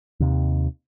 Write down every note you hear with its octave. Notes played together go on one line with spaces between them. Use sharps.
D#2 C3 D#3